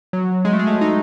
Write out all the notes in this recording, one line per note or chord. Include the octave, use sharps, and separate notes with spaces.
F#3
G#3
A3
G#3
A3
D#4